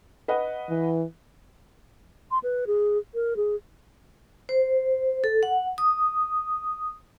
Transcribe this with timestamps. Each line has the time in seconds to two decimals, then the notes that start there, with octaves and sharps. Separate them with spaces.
0.28 B4 D#5 F#5
0.69 E3
2.31 C6
2.43 B4
2.67 G#4
3.15 A#4
3.37 G#4
4.49 C5
5.24 A4
5.43 F#5
5.78 D#6